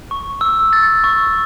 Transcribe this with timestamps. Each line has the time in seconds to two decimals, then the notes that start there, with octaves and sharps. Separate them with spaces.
0.11 C#6
0.41 E6
0.73 A6
1.04 C#6